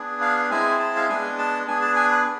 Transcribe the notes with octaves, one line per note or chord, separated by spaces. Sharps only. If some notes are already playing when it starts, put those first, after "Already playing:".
Already playing: B3 D4 G#4
F5
G#3 C4 E4 G#4 G#5
A5
F5
G#3 B3 D4 G#5
A5
B3 D4 G#4 G#5
A5
G#5
B4